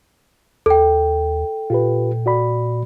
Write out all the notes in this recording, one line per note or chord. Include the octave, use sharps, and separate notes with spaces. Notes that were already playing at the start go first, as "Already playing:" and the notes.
D#2 A4 G5
A#2 F4 G4 B4
F#4 D5 B5